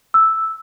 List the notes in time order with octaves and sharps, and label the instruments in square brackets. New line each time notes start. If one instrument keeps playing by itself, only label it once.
[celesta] E6